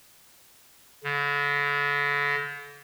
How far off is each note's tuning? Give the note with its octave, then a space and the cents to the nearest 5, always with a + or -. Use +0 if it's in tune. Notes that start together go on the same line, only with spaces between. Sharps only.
D3 -40